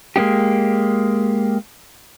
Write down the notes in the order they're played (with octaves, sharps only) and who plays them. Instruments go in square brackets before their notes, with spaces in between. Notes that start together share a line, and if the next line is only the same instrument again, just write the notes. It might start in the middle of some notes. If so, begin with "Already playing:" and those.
[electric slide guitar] G#3 A#3 B3 D#4 G4